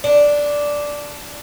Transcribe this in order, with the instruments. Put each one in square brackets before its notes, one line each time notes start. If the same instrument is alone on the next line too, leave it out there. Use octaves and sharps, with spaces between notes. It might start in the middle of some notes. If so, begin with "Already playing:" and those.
[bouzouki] D4